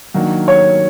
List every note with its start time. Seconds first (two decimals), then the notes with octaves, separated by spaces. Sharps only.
0.14 D#3 F#3 A#3 D4 F#4
0.48 C#5